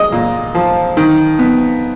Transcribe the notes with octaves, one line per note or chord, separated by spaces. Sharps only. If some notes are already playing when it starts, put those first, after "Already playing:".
Already playing: G#3 D#5
A#2
F3
D#3
B3